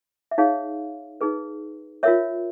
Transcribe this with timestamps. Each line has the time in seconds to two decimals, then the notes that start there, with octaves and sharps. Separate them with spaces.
0.31 E5
0.38 D#4 G#4 C#5 F5
1.21 D#4 G#4 B4
2.03 F4 A#4 C#5 E5